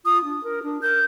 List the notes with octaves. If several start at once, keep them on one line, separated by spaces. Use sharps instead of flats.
F4 D#6
D4
A#4
D4
A#4 G6